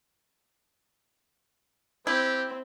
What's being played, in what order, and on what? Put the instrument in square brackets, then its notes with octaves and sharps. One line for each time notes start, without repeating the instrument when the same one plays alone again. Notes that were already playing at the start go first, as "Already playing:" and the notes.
[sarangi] C4 [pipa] E4 [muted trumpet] G4